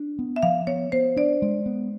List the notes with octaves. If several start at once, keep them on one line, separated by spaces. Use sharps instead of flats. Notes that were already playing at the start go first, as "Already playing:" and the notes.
Already playing: D4
B3
E5
F3 F5
B3 C#5
B3 C5
D4 D5
G#3
B3